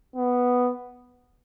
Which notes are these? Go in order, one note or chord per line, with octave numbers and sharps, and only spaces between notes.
B3